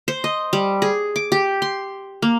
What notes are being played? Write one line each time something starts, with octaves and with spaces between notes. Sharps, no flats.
C5
D#5
G3
G#4
D6
G4
C6
A#3